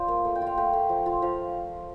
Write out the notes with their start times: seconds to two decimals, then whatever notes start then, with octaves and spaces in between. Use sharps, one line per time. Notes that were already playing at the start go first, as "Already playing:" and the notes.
Already playing: F4 C5 D5
0.08 A#3
0.25 A3
0.35 G5
0.41 F4
0.47 F5
0.57 A3 G5
0.73 A3
0.89 F3
1.06 F4
1.22 F3 F5